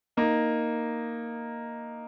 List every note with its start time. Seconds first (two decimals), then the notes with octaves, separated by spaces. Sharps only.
0.17 A#3 D#4